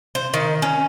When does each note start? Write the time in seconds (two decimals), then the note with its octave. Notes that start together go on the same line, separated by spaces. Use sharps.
0.15 C5
0.34 D#3
0.62 C#4